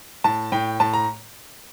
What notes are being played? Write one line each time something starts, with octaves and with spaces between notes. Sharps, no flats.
A2 A5
A2 G5
A2 A5
A#5